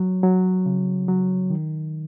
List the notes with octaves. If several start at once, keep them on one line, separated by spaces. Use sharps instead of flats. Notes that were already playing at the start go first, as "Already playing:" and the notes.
Already playing: F#3
F#3
C#3
F#3
D#3